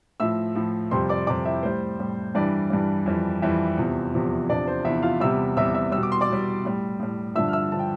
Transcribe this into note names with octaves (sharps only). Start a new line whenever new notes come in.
A2 F3 E5 E6
A2 F3
F2 C3 G3 C5 C6
D5 D6
F2 C3 G3 D5 D6
E4 E5
A2 G3 C5
A2 G3
G2 E3 G3 D4 D5
G2 E3 G3
F2 E3 G3
F2 E3 G3 E4 E5
E2 C3 F3
E2 C3 F3
E2 C3 F3 D4 D5
C5
E2 C3 F3 E4 E5
F4 F5
E2 C3 G3 E5 E6
E2 C3 G3 E5 E6
E5 E6
B2 G3 E6
D6
C6
D5 D6
B2 G3
A2 G3
A2 G3
G2 D3 F3 E5 E6
F6
E5 E6
D3 F3 A5
G5